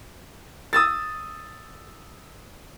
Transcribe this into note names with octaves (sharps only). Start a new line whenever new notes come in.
D#6 E6 A6